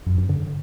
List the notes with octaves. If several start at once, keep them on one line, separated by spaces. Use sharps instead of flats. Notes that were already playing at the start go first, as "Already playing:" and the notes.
F#2
G2
D3